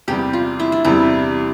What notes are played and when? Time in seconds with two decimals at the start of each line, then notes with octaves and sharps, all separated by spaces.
0.08 E2 C3 G3 G4
0.33 F4
0.60 E4
0.72 D4
0.85 E2 C3 G3 E4